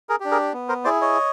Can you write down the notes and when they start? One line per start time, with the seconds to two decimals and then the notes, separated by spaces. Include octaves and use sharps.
0.09 G#4 A#4
0.20 D4 G4
0.31 G#4 A#4
0.53 B3
0.69 A#4 C5
0.84 E4 G#4 C5 D5
1.01 C#5 D#5